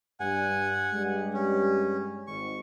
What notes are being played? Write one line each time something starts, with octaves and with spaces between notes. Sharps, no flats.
G2 F#5 G#5
G2 G#3 G4
C#4
G#1 C#6